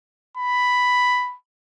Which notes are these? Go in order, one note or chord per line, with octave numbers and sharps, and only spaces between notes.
B5